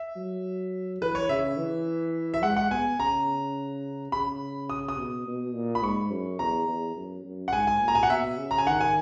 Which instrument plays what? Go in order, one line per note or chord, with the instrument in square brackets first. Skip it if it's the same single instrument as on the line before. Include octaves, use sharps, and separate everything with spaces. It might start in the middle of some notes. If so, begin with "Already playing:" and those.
Already playing: [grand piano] E5
[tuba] F#3
[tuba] E3 [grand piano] B4
[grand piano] C#5
[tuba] C#3 [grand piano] E5
[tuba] E3
[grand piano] E5
[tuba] G#3 [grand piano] F#5
[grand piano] F#5
[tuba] B3 [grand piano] G#5
[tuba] C#3 [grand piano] A#5
[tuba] C#3 [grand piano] B5
[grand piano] D#6
D#6
[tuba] B2
B2
A#2
[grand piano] B5
[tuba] G#2 [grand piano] C#6
[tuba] F#2
[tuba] E2 [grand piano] A#5
[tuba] E2
F#2
F#2
[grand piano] F#5
[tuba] G#2 [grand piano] G#5
[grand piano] G#5
[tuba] A#2
[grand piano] A#5
G#5
F#5
[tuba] B2 [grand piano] E5
[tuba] C#3
[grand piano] A#5
G#5
[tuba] D#3 [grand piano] F#5
[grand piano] G#5